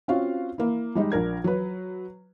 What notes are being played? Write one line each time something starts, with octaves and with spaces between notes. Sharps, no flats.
C4 C#4 F4 F#4 F5
A#3 E4
G3 G#3 D#4
A#1 D4 A#4 G#6
F#3 B4